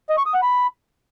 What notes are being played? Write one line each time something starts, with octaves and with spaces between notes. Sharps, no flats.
D#5
C#6
D#6
F#5
B5